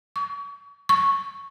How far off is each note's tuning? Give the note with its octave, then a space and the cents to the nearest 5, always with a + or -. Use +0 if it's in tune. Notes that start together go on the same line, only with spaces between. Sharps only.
C#6 +35
C#6 -5